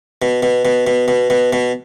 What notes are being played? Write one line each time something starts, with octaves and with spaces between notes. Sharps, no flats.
B2
B2
B2
B2
B2
B2
B2